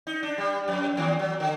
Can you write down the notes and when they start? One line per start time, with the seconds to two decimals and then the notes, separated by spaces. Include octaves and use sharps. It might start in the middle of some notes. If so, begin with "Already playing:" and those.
0.07 D#4
0.23 D4
0.38 G3
0.68 F2
0.97 D#2
1.19 F#3
1.40 D3